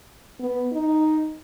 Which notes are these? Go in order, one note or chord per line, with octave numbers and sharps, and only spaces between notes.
B3
D#4